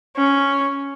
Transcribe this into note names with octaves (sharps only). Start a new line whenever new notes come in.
C#4